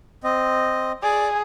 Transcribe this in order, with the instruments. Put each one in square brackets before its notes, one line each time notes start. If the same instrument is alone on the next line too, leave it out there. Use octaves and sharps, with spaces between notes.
[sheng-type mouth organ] C4 D#5
[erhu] G#4 [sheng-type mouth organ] D5 D6